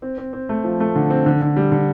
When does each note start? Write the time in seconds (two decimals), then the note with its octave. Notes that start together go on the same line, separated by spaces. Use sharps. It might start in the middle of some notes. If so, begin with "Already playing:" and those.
0.02 C4
0.18 C4
0.33 C4
0.49 A3
0.64 F3
0.80 A3
0.96 D3
1.10 C4
1.26 D3
1.42 D3
1.56 G3
1.72 D3